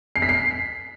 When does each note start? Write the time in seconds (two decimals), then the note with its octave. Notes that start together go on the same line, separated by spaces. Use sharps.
0.16 C7
0.22 B6
0.29 C7